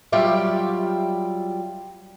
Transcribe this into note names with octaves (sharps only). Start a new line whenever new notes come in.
F#3 G3 F4 G4 E5